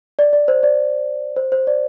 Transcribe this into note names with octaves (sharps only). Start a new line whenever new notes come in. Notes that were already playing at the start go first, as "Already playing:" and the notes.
D5
D5
C5
D5
C5
C5
D5